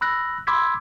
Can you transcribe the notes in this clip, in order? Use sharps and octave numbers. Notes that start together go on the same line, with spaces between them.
B5 E6 F#6 A#6
B5 C6 D6 E6 G#6 B6